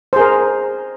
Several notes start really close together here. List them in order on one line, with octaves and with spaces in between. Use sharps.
C5 G#4 A#4